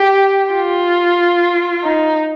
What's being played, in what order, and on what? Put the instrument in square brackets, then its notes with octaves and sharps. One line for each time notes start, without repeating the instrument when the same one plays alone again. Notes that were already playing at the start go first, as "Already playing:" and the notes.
Already playing: [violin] G4
F4
D#4